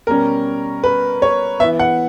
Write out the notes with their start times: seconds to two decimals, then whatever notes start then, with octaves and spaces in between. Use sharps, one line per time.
0.07 B2 G3 C#4 A#4
0.84 B4
1.22 C#5
1.60 B3 E5
1.64 E3
1.79 F#5